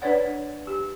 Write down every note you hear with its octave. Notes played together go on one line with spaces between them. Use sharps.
D4 B4 C#5 D5 F#5
G4